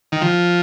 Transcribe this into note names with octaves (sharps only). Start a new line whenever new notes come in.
D#3
F3